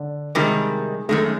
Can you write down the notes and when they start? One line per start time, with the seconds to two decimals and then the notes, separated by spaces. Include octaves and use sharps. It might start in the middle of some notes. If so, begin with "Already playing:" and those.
Already playing: D3
0.35 C3 D#3 G3 G#3
1.09 F#2 D#3 G#3 A3